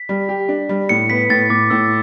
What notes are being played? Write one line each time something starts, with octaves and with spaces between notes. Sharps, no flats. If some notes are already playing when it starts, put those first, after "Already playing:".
Already playing: B6
G3
G4
D4
G3
A2 C#7
B3 B6
A2 A6
A2 D6
A2 E6